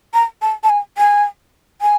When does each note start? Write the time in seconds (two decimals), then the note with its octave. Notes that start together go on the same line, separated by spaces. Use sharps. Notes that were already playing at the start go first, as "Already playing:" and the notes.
0.14 A#5
0.42 A5
0.64 A5
0.70 G#5
0.98 G#5
1.82 G#5